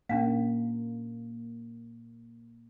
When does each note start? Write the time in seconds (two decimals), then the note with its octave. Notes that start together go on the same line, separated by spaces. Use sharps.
0.09 A#2 A#3 C#4 D4 F5